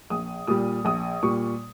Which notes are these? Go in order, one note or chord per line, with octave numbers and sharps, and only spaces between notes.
A#1 D#6
A#2 G3 D#6
A#1 D#6
A#2 G3 C#6